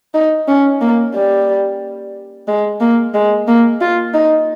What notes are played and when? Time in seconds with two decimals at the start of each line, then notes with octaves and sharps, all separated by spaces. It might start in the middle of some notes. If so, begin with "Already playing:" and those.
0.14 D#4
0.48 C#4
0.81 A#3
1.14 G3
2.48 G#3
2.81 A#3
3.14 G#3
3.47 A#3
3.81 F4
4.14 D#4